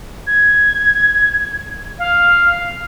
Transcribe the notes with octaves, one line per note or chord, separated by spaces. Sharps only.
G#6
F5